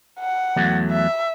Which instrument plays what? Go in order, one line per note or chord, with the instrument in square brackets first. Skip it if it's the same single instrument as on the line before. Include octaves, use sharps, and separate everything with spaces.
[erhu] F#5
[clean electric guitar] E2 F#3 A3
[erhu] E5